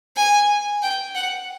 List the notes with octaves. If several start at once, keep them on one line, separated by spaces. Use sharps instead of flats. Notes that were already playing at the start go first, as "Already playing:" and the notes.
G#5
G5
F#5